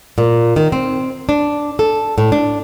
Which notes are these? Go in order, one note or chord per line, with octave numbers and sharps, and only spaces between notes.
A#2
D#3
C4
D4
A4
A2
D4